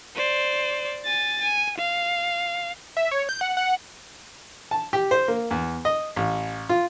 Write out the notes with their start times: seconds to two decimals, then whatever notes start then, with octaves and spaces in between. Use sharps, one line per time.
0.16 C5 D5
1.05 G#5 A6
1.42 G#5
1.78 F5
2.97 E5
3.11 C#5
3.29 G6
3.41 F#5
3.57 F#5
4.71 A5
4.93 G4
5.11 C5
5.28 A#3
5.51 E2
5.85 D#5
6.16 A1
6.69 F4